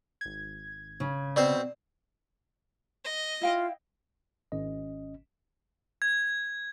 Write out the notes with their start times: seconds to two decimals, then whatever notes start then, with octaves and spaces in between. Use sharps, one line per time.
0.21 G#1 G#6
1.00 C#3
1.36 B2 C4 C5 D5
3.04 D#5
3.41 E4 F4 F5 G5
4.52 G#1 C#4 D#5
6.02 G#6